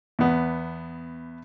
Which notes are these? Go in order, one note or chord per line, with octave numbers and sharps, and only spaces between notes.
E2 B3